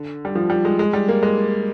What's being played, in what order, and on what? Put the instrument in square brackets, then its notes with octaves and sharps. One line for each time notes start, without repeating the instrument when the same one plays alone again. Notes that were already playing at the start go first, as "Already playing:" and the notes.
Already playing: [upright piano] D3
G3
F3
G3
G#3
G#3
G3
A#3
G#3